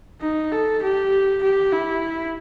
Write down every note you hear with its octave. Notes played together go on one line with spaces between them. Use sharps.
D#4
A4
G4
G4
E4